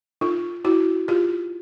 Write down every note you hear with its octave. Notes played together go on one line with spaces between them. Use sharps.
D#4 F4
E4 F#4
F4 G4